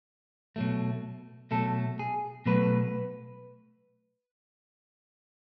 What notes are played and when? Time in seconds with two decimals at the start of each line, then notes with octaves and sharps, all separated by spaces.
0.56 B2 F#3 A3
1.51 B2 F#3 A3 A4
1.99 G#4
2.46 B2 F#3 A3 B4